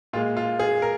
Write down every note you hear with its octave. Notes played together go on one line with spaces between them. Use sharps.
A#2 G#3 F4
F4
G#4
A#4